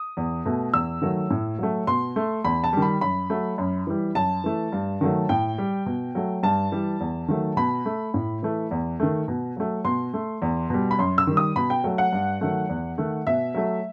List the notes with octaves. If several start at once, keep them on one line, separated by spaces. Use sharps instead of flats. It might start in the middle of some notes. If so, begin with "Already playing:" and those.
Already playing: D#6
E2
B2 A3
E2 E6
D#3 F#3 A3
A2
F#3 A3
B2 C6
A3
E2 B5
A5
D#3 G3
B5
F#2 B5
F#3 A3
F#2
E3 G3
F#2 A5
E3 A3
G2
D#3 F#3 A3
A2 G5
G3
B2
F#3 A3
G2 A5
E3 G3
E2
D#3 F#3 A3
B2 B5
A3
A2
E3 A3
E2
D#3 A3
B2
F#3 A3
B2 C6
A3
E2
B2 G3
B5
F#2 C6
E6
D#3 G3
D#6
B2 B5
G5
F#3 A3
F#5
G2
D#3 F#3 A3
E2
D#3 A3
B2 E5
F#3 A3